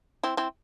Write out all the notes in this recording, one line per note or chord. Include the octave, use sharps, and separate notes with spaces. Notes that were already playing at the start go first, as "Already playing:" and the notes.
C4 E4
C4 E4